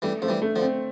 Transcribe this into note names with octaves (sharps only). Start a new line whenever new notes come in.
E3 G3 A3
F3 A3
E3 G3
A3
D3 F3
C4